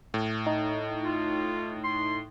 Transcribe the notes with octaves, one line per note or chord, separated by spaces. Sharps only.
A2
D#4
F4
C6